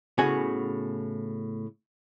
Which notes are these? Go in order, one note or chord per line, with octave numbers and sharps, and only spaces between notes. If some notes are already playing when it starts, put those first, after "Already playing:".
A2 C#3 B3 F#4 F#5 G#5